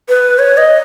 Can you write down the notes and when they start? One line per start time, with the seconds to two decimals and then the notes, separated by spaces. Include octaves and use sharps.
0.09 B4
0.39 C#5
0.57 D#5